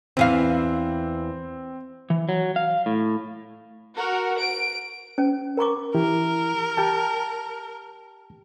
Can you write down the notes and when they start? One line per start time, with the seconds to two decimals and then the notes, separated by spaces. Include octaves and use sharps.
0.17 E2 E3 C4 F5
2.10 E3
2.29 F#3
2.56 F5
2.86 A2
3.96 F#4 A#4
4.41 D7
5.18 C#4
5.57 A#4 A#5 C#6 D6
5.95 E3 E4 G4 A#4
6.77 G4 G5 A5